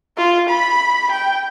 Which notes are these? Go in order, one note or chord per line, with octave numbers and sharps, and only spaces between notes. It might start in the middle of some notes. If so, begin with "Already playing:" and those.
F4
B5
G5